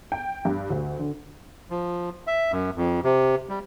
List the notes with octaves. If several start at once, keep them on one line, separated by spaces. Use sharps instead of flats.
G5
G2
D2
D3
F3
E5
F#2
F2
C3
G3